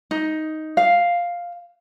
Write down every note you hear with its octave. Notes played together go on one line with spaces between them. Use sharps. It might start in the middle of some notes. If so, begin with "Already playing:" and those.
D#4
F5